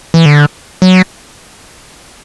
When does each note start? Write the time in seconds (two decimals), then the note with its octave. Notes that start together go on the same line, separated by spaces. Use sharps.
0.14 E3
0.26 D3
0.82 F#3